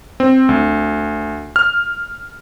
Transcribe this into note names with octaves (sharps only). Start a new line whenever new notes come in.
C4
D2
F6